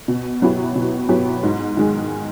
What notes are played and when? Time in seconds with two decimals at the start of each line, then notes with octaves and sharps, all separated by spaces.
0.08 B2
0.42 F#3 B3 E4 G4
0.76 B2
1.09 F#3 B3 E4 G4
1.43 G#2
1.77 D#3 G#3